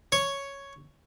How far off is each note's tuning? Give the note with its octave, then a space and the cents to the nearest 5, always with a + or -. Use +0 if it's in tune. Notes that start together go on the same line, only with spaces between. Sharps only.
C#5 +0 C#6 +0